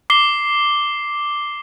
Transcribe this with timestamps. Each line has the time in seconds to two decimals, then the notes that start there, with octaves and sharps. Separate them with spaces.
0.10 D6 C7 G7